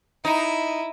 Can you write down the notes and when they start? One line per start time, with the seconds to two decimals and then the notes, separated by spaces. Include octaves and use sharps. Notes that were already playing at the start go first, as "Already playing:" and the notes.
0.25 D#4 E4